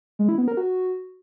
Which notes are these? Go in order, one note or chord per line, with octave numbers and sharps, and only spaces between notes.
G#3
E4
B3
A#4
F#4